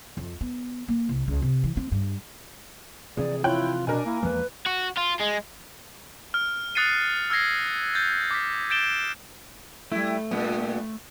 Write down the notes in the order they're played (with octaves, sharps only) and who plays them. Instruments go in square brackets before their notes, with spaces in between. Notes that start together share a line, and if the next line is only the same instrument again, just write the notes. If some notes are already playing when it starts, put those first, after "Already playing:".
[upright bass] F2
B3
A#3
C2
C#2
C3
E3
C4
G2
[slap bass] C3 E3 F3 [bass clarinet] G#4 [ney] D5
[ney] E4 [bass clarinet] F4 [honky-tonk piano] C#5 G5 F#6
[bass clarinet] B2 [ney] D4 [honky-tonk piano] A#4 G#5
[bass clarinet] A#3 [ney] E4
[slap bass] E2 F3 G#3 [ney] B4
[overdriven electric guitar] F#4
F4
G#3
[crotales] F6
D#6 F#6 A6 C7 C#7 D#7
E6 F6 G#6 A#6 C7
G6 A6
D6 B6
G6 A6 D7 E7 G7
[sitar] G3 E4 [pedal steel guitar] A3
[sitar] G2 A#2 B3